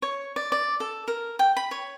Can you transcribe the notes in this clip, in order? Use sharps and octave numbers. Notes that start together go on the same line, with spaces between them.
C#5
D5
D5
A4
A#4
G5
B5
C#5